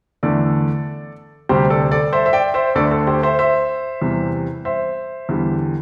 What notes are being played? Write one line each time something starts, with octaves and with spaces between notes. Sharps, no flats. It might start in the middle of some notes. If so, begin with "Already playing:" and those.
E2 D3 A3 A4 D5
D2 C3 G3 G4 C5
A4 D5
A4 D5
C5 E5
E5
D5 G5
C5 E5
D2 D3 A3 A4 D5
A4
G4 C5
C5 E5
C5 E5
E2 C3 G3
C5 E5
E2 D3 G3